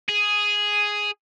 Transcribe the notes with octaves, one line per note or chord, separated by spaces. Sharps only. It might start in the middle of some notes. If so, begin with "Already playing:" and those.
G#4